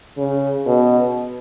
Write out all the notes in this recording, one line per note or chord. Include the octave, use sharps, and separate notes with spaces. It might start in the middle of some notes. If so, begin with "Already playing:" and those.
C#3
B2